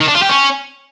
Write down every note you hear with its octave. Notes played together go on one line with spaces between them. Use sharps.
D#3
D4
F4
G4
C#4